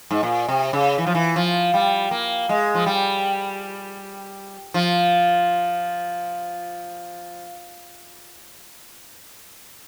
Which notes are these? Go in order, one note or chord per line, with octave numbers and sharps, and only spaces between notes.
G#2
A#2
C3
C#3
E3
F3
E3
F3
G3
A#3
G#3
F3
G3
F3